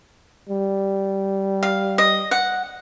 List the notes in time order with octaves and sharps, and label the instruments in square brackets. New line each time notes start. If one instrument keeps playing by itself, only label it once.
[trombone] G3
[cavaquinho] F5
D#5
F#5